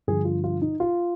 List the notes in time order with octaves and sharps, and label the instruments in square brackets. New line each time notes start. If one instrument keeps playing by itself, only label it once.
[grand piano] G2 D3 F3 G#4
F4
F4
D#4
F4